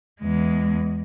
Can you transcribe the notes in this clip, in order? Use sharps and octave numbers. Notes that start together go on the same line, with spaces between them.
E2 G#3